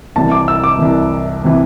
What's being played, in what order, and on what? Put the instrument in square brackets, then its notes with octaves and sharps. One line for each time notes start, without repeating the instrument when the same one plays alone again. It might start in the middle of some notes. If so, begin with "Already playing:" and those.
[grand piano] C2 C3 E3 A5
D6
E6
D6
C2 C3 E3
C3 E3